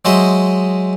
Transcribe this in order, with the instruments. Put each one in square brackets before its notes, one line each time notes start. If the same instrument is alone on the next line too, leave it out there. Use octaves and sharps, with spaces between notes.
[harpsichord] F#3 G#3 C5 D#5 E5